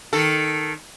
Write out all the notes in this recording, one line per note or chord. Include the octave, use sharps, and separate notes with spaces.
D#3 A4